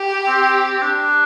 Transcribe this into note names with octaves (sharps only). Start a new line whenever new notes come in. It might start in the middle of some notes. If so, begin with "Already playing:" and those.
Already playing: G4
C4
C4
D4